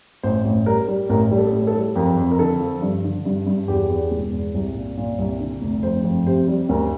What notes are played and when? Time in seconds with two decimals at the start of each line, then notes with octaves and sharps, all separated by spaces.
0.23 A1 C5
0.45 A1
0.66 G3 A#4
0.88 G3
1.09 A1 A#4
1.31 G3
1.38 A4
1.52 A2
1.67 A4
1.75 G3
1.96 F2 A#4
2.17 F2
2.31 A#4
2.39 D3 A4
2.60 F3
2.82 G2
3.04 D3
3.25 G2
3.47 G2
3.68 E2 G4
3.90 E2
4.11 E1
4.33 E2
4.54 C2
4.75 A#2
4.97 A#2
5.19 C2
5.40 D3
5.62 F1
5.83 F2 C5
6.04 F2
6.27 C3 C5
6.48 G3
6.69 D2 A#4